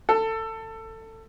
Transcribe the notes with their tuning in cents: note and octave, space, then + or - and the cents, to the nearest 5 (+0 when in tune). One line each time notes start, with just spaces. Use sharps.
A4 +20